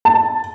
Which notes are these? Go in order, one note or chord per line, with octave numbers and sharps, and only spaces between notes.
A5